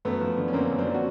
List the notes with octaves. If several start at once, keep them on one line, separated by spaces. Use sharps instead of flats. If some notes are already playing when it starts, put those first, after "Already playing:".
F#2 A3 B3
F3
D3
C#4
F#2 A#3 C4
F#2
C4 D4
F3
F#4